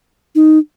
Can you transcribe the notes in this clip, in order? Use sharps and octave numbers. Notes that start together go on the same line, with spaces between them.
D#4